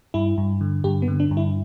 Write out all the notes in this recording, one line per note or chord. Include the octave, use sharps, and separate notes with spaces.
G2 E4
G2
D3
G2 G4
B3
D3
D4
G2
E4